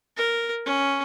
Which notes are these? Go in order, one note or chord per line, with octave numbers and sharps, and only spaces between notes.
A#4
C#4